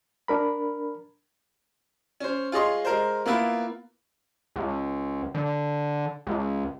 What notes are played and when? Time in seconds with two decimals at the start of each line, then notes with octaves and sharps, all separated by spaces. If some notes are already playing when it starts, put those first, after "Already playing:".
0.28 D4 A#4 B5
2.20 C#4 C5
2.52 F4 G#4 C#5 D#5 C6
2.85 G#3 A#4 C5
3.26 A#3 B3 E4 F4 B5
4.56 C#2
5.35 D3
6.27 C#2